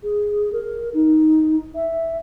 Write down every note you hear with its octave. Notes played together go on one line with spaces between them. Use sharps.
G#4
A#4
D#4
E5